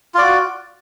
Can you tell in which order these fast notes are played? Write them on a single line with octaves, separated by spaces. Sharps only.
F4 D5 F#4